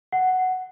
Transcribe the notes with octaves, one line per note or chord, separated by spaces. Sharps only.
F#5